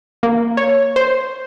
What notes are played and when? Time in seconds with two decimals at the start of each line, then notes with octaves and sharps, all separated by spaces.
0.23 A#3
0.57 C#5
0.96 C5